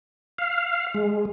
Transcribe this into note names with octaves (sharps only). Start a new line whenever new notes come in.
F5
G#3